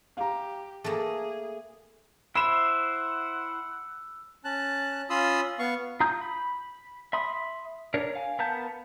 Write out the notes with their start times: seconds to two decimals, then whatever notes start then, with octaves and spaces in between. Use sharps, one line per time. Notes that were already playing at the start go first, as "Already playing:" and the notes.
0.17 G4 F5 A#5
0.84 A3 A#3 G#4
2.35 E4 C5 E5 F#5 B5 E6 E7
4.44 C#4 A5 F#6
5.10 C#4 F4 B5 C6 D#6 E6
5.59 B3 F5 C#6
6.00 F4 A#5 D#6 G6
6.21 B5
7.13 E5 B5 C6 D#6
7.94 D4 A#4 C#5
8.15 F5 G#5
8.39 B3 A#4 F5 A5 G6